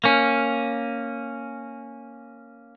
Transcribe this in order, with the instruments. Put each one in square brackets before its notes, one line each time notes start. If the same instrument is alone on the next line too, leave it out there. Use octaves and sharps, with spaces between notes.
[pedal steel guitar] A#3 C#4